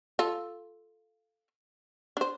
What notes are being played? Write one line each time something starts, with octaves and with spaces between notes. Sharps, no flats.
F4 A4
D4 C5